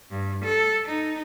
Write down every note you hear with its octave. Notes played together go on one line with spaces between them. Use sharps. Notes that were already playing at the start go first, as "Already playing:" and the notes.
G2
A4
D#4